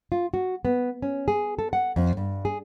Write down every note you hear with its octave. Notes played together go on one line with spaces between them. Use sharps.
F4
F#4
B3
C#4
G#4
A4
F#5
F2
G2
G#4